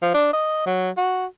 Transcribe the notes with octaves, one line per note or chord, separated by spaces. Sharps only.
F3
D4
D#5
F#3
F#4